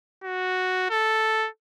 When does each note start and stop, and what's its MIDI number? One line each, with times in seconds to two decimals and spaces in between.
0.24 0.90 66
0.90 1.48 69